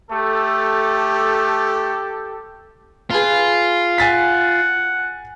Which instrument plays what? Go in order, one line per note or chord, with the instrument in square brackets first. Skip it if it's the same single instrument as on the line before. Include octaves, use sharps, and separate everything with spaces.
[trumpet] A3 [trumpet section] G4 A4
[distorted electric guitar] F4 [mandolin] G#4 B4 A5
[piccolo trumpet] F#5 [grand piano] G#5 A6 B6